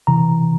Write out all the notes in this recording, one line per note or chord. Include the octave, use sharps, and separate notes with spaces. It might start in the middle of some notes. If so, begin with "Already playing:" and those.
C3 E3 A#5